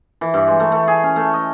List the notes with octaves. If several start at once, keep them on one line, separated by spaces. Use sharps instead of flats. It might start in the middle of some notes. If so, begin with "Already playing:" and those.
E3
G2
G#3
A3
A3
G#4
C#4
A3
D#5